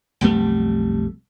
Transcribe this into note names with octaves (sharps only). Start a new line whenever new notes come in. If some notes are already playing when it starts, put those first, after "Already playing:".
B1 F2 G3 A3